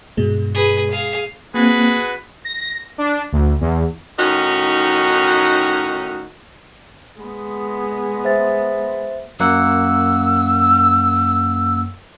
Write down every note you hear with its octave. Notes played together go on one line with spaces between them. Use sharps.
G2 B2 G#3
G#4 B4
G#4 F5
A#3 C4 F#4 G#4 B4
A#6
D4
D2
E2
A2 D#3 C#4 D#4 F#4
G#3 B3
C5 E5 A6
F#2 A#3 F#5 E6